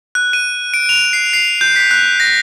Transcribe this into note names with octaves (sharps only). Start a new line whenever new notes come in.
F#6
D#7
D7
F7
C7
C7
G6
B6
F#6
A#6